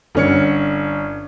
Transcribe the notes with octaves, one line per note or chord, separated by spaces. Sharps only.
G1 D3 C#4 F6 C#7